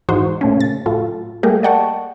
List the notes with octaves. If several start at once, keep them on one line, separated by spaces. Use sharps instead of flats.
G#2 E3 D#4 F#4 C5
A#2 A3 C#4
C#3 A6
A2 F#3 F4 A4
G3 A3 A#3 G4 G#4 A#4
D5 D#5 F#5 G5 A5 C#6